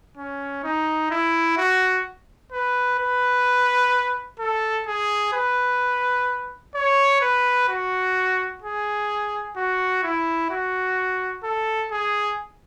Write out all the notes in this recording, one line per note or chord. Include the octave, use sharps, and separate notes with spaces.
C#4
D#4
E4
F#4
B4
B4
A4
G#4
B4
C#5
B4
F#4
G#4
F#4
E4
F#4
A4
G#4